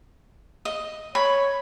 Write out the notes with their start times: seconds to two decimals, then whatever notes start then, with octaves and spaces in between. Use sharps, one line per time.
0.65 D#5
1.15 C#5 B5